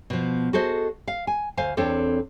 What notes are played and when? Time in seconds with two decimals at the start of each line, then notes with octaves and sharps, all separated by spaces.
0.10 B2 F3
0.53 F#4 G#4 A4 C5 D#5
1.08 F5
1.27 G#5
1.57 D2 C5 F5 G#5
1.77 E2 C4 D4 A4 C#5